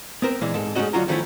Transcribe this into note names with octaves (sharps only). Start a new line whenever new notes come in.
B3 C4 A#4 C5
A#2 E3 G#3 A#3
G#2 A4
G#3 A3 C#4 D#4 F#4 D#5
D2 F#3 C#4 F4 F#4 A#5
D#3 F3 A3 C#4 E4